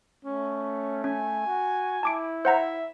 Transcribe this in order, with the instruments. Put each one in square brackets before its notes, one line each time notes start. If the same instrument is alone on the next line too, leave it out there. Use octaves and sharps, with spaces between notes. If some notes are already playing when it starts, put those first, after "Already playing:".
[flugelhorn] A3 [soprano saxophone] C#4
[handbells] C#4 [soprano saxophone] G#5
[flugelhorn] F#4
[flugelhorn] E4 [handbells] A5 D6 D7
[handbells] C5 F#5 A#5 [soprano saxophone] E5